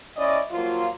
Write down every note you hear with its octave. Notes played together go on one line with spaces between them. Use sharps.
C#4 E4 D5 D#5
F3 F#3 A#3 F4